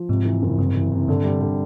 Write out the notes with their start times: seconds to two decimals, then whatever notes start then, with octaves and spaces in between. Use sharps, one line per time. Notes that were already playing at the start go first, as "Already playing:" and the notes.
Already playing: F3
0.09 G#2 C3
0.25 E3
0.42 F#1
0.58 G2 C3
0.74 E3
0.91 C3
1.08 G2 D3
1.24 G3
1.41 D3